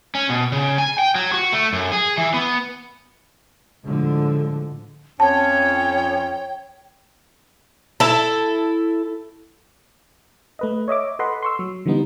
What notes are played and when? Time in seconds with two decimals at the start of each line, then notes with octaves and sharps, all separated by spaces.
0.15 C#4
0.29 B2
0.52 C#3
0.78 G#5
0.99 G5
1.15 F#3
1.34 F#4
1.53 A3
1.73 F#2
1.92 G#4
2.17 E3
2.34 B3
3.86 A2 D3 F3 G#3
5.20 F2 C#4 C#5 G5 A5
8.00 E4 A4
10.59 A3 B4 D#5
10.88 C#5 D#5 E5 D6
11.19 A4 B4 D#5 F#5 B5 C6
11.43 C6 C#6 E6
11.59 F#3
11.86 D3 E3 G3 B3 D#4